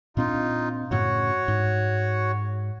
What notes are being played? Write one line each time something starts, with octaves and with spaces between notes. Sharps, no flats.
A#2 C4 D4 D#4 F4
F#2 A2 C#3 F#4 C#5
G#2